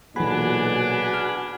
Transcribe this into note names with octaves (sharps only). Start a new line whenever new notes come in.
B1 A#2 E3 D4 F#4 G#4 B4 B5
F6